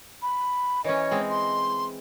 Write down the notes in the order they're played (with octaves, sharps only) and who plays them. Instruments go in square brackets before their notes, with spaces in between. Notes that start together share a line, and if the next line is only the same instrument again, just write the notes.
[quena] B5
[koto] E3 C#4 [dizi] C#5 [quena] D#5
[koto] G#3 C4
[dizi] C6